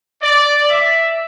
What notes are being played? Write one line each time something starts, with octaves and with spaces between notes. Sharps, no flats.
D5
E5